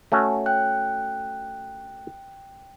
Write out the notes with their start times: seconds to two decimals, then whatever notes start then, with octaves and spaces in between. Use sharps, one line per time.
0.12 A3 C#4 F#4
0.46 G5 F#6